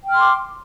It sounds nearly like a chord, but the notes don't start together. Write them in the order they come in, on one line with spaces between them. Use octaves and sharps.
G5 F6 C6 D6